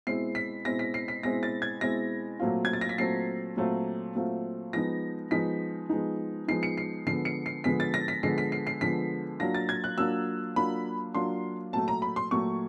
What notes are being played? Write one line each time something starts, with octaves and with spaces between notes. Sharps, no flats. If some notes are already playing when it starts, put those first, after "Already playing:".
B2 G#3 C4 E4 C7
B6
B2 G#3 C4 E4 A#6
B6
C7
B6
B2 G#3 C4 E4 A#6
A6
G#6
B2 G#3 C4 E4 A#6
A#2 F#3 A3 C4 F4
G#6
A6
A#6
B6
A#2 F#3 A3 C4 F4 C7
A#2 F#3 A3 C4 F4
A#2 F#3 A3 C4 F4
F3 G#3 B3 D#4 A#6
F3 G#3 B3 D#4 B6
F3 G#3 B3 D#4
F3 G#3 B3 D#4 C7
C#7
C7
D3 F3 G#3 B3 C7
C#7
C7
D3 F3 G#3 B3 B6
A6
A#6
B6
D3 F3 G#3 B3 C7
B6
C7
C7
D3 F3 G#3 B3 B6
F#3 A#3 D4 F4 A#6
A6
G#6
F#6
F#3 A#3 D4 F4 E6
F#3 A#3 D4 F4 B5
F#3 A#3 D4 F4 C6
A#2 F#3 A3 A5
A#5
B5
C6
A#2 F#3 A3 C#6